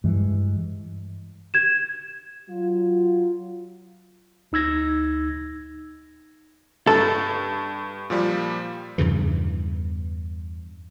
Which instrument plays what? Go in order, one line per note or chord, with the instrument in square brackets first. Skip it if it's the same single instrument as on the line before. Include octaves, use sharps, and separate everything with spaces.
[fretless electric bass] G2 E3 G#3
[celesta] G#6 E7
[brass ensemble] F#3 F4
[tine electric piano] D2 D#4 E6 G#6 A#6
[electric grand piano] G2 [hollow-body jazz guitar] A4
[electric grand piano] A#2 F3 G3
[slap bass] E2 G2 C#3 E3